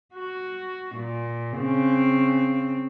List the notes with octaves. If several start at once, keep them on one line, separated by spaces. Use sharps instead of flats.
F#4
A#2
C#3 C4